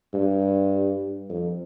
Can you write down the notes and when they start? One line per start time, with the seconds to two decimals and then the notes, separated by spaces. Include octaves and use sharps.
0.13 G2
1.30 F2